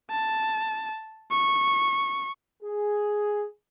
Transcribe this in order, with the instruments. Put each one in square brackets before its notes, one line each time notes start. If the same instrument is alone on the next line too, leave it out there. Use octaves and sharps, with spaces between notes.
[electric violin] A5
C#6
[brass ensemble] G#4